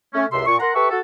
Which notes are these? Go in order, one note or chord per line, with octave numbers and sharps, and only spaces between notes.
A3 C#4
C#2 F#2 C3 E5 C6
A#2 C#6
A#4 F#5 A#5 C6
G4 A4 B4 E5 C#6
F#4 A4